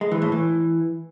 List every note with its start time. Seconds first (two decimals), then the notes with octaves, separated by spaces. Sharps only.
0.01 G#3
0.11 E3
0.22 A2
0.32 E3